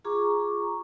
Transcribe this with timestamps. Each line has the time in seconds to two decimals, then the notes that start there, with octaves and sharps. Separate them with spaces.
0.05 F4 G#4 A#5 C#6 D6